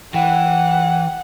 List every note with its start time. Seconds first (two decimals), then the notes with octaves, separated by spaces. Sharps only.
0.14 E3 F#5 G5